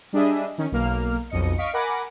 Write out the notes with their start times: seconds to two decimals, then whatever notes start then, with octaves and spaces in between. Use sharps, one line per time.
0.13 G3 D4 G#4 D#5 E5
0.58 D#3 C#4
0.72 B1 A#3 F6
1.30 B1 F2 D#5 C#7
1.58 D#5 F5 C#6 B6 D7
1.73 A#4 F#5 G#5 B5 D6 A#6